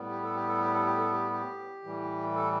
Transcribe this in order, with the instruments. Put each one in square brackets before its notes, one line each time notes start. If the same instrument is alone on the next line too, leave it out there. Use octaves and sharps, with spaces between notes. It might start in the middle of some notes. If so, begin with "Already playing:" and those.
Already playing: [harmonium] A2 G3 B3
G4
A4
G4
A4
G4
A4
G4
A4
G4
G4
A2 E3 G3
A4